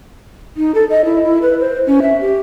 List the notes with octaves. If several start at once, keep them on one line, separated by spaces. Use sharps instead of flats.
D#4
A4
D#5
E4
E4
B4
C5
C#4
E5
G4